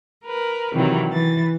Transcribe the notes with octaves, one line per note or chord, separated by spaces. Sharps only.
A#4 B4
C3 D#3 E3 F#3
E3 A6